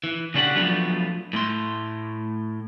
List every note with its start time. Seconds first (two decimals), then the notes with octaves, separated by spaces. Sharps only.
0.04 E3
0.34 C#3 C#4 D4 G4 F#5
0.55 F3 F#3 A3 B3 D4 F4
1.33 A2 A3 C6